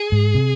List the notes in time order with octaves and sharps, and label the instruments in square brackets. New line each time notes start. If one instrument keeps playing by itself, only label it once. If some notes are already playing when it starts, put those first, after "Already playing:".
Already playing: [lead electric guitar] G#4
[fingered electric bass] G#2
C3